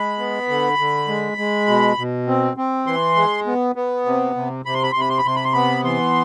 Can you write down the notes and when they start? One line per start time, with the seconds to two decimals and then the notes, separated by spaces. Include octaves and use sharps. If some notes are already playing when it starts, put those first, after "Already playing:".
Already playing: G#3 B5
0.19 B3
0.48 D3
0.79 D3
1.08 G#3
1.38 G#3
1.67 B2
1.98 B2
2.27 C4
2.57 C4
2.87 E3 C6
3.16 G#3
3.46 B3
3.76 B3
4.06 C3
4.36 C3
4.65 C3 B5
4.74 C6
4.83 B5
4.92 C3 C6
5.00 B5
5.09 C6
5.18 B5
5.25 C3 C6
5.36 B5
5.45 C6
5.53 B3 B5
5.84 E3 C6